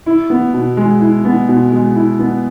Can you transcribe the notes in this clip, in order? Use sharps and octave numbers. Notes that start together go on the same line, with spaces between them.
E4
B3
B2
G#3
E4
B3
B2
G#3
E4
B3